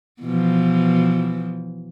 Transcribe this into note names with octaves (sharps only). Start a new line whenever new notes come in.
B2 E3 F3